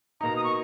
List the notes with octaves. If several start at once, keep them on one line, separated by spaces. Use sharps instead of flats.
B2 A#3 D#4 A#5
D#6
C#6